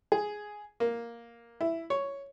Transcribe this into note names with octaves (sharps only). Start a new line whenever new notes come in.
G#4
A#3
E4
C#5